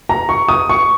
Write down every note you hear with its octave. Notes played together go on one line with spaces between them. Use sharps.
A#5
C#6
D#6
C#6